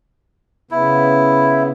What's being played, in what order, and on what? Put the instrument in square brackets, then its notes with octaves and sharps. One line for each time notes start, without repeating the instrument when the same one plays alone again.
[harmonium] C#3 B3 [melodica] E4